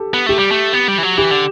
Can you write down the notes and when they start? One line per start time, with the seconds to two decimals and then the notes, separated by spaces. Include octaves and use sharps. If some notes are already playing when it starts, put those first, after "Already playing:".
Already playing: G4 A4
0.14 B3
0.26 A3 G4
0.39 G3
0.51 A3
0.73 B3
0.88 G3
0.98 E3
1.03 F#3
1.18 E3 G4
1.31 D3